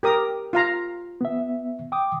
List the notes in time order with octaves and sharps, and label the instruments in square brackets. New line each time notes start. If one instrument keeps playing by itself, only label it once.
[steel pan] G4 A#4 D#6
F4 F5 A#5
[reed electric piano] B3 E5
G5 D6 D#6